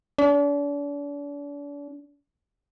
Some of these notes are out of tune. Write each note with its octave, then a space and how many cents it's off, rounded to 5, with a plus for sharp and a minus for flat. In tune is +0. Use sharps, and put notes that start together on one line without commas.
D4 -40